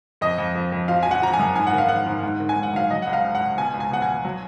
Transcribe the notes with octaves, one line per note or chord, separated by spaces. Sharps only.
F2 D#5
F2
F2
F2
F3 F5
F3 G#5
F#5
F3 A#5
G#5
F#2
G#2 G#5
F#5
D#3
F5
G#2 F#5
G#2
G#2
D#3
G#5
G#2
F#5
F#3 F5
F#3 D#5
C#2 F#5
F5
C#2
F#5
C#2
B2 G#5
C#2
G#5
B2 F#5
G#5
B2
F#3